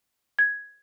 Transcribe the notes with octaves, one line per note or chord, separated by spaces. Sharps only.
G#6